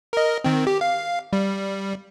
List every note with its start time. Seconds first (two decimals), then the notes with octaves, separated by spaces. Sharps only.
0.13 A#4 D#5
0.44 D#3 C4
0.67 G4
0.81 F5
1.33 G3